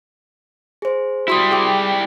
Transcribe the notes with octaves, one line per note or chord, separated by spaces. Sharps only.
G#4 C5
G3 E4 F#4 C6 D#6
G#4 G5 D6